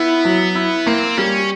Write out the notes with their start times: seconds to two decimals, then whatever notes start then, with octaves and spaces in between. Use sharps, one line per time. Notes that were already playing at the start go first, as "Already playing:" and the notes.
Already playing: B3 E4
0.25 F#3
0.55 E4
0.86 A#3 C4
1.17 G3 C#4